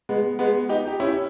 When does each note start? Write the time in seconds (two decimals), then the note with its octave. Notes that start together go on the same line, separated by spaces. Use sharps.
0.09 G#3 B3
0.39 G#3 B3
0.69 D#4 G4
0.88 G4
1.00 C#4 E4